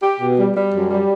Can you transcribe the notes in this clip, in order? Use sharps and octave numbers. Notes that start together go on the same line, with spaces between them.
G4
B2
G3
G3
F#2
G3